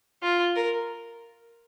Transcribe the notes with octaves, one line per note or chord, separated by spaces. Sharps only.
F4
A#4